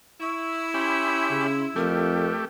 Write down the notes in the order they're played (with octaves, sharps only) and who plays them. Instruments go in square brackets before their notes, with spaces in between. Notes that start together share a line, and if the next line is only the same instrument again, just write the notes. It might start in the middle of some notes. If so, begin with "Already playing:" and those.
[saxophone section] E4 [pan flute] C#6
[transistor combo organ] C#4 G4 B5 [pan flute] C6
[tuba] C#3
[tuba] F2 [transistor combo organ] A3 G4 [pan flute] A#4